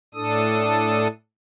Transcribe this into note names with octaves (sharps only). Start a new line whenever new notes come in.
A2 D4 A4 D#6